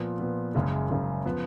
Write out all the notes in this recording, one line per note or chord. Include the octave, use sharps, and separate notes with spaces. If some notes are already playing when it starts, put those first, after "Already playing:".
Already playing: A#2 F3 B3
A#2 F3 B3
F#1 F#2 C#3 G#3
F#1 F#2 C#3 G#3
F3 B3